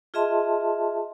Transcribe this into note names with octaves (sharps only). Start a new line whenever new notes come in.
F4 G#4 D#5 E5 A5 C6